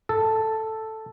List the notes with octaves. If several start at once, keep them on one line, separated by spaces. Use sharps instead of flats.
A4